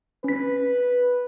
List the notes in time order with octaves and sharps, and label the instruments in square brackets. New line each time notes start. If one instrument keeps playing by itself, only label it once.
[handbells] C#4 B6 [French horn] B4